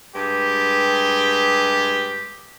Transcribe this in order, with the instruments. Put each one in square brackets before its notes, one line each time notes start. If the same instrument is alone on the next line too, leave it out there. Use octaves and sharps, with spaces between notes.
[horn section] G2 G#3 G4